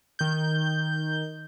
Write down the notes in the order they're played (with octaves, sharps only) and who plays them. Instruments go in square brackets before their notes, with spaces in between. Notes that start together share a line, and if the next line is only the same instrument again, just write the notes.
[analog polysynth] D#3 G6